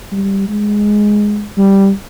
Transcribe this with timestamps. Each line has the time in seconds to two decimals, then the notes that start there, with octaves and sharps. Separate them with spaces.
0.12 G3
0.49 G#3
1.58 G3